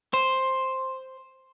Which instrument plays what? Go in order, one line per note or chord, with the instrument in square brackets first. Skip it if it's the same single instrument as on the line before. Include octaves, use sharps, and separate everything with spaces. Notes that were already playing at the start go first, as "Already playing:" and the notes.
[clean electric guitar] C5